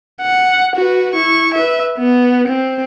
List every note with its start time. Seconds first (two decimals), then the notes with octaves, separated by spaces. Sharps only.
0.21 F#5
0.76 F#4 B4
1.14 E4 C#6
1.54 B4 E5
1.98 B3
2.48 C4